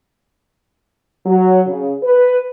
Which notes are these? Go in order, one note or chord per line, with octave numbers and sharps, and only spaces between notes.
F#3
C#3
B4